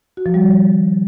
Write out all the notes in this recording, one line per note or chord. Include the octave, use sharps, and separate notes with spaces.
F#4
F3
G3
D#3
F3